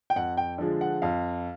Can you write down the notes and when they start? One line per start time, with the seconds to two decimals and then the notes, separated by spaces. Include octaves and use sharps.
0.10 G5
0.16 F2 F#5
0.37 G5
0.58 D3 F3 G#3
0.81 F#5
1.02 F2 F5